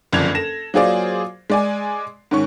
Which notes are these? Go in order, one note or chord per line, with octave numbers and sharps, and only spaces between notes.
F#1 F2 D3 D4 G#6 F7
A4 A#6 E7
F#3 A#3 F4 G#4 C5 D5
G#3 D5 G#5
G#2 D#3 C#4 C#6